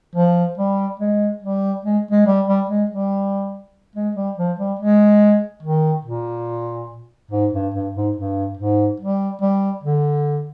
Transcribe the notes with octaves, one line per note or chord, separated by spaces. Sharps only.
F3
G3
G#3
G3
G#3
G#3
G3
G3
G#3
G3
G#3
G3
F3
G3
G#3
D#3
A#2
G#2
G2
G2
G#2
G2
G#2
G3
G3
D3